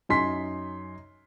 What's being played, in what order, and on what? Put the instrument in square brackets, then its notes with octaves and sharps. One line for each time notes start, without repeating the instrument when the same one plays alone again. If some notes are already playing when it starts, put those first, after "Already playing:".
[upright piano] F#2 D#4 G#5 C6 B6